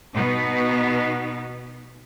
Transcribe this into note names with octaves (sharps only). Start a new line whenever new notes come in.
B2 B3 D#4